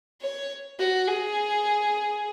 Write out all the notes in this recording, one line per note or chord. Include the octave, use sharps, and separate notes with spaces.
C#5
F#4
G#4